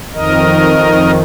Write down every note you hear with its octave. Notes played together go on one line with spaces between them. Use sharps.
F2 D#3 A#4 D#5